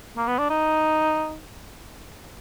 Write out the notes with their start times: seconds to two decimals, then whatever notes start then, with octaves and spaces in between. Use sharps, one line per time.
0.17 A#3
0.28 B3
0.39 D4
0.50 D#4